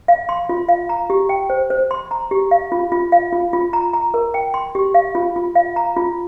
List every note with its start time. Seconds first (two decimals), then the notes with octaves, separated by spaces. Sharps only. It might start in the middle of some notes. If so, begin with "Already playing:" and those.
0.08 F5
0.29 C6
0.49 F4
0.69 F5
0.89 A#5
1.10 G4
1.29 G5
1.50 C5
1.70 C5
1.91 C6
2.11 A#5
2.31 G4
2.51 F5
2.72 F4
2.92 F4
3.12 F5
3.33 F4
3.53 F4
3.73 A#5
3.93 A#5
4.14 A#4
4.34 G5
4.54 C6
4.75 G4
4.94 F5
5.15 F4
5.36 F4
5.55 F5
5.76 A#5
5.97 F4